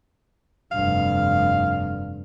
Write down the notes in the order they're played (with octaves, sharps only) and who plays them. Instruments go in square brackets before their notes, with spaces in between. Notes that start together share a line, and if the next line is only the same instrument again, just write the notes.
[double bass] F1 G2 [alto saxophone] F5